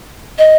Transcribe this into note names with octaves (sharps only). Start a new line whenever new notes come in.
D#5